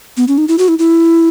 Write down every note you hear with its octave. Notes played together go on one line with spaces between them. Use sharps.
B3
C#4
D#4
E4
F#4
E4
E4